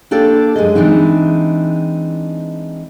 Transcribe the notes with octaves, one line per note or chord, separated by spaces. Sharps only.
A#3 D4 G4 A4 D5
F#2 G#3 G#4 D#5
E3 G#3 C4 D4 D#4